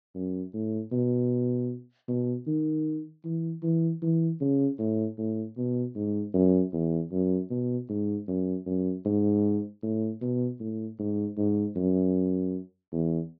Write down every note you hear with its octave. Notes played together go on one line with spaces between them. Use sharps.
F#2
A2
B2
B2
D#3
E3
E3
E3
C#3
A2
A2
B2
G#2
F#2
E2
F#2
B2
G#2
F#2
F#2
G#2
A2
B2
A2
G#2
G#2
F#2
E2